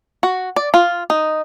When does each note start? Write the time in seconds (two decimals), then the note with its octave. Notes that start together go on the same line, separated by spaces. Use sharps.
0.23 F#4
0.56 D5
0.74 F4
1.10 D#4